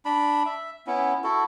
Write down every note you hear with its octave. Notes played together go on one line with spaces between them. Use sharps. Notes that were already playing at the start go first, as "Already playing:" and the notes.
D4 B5
E5
B3 C#4 E4
E4 F#4 A4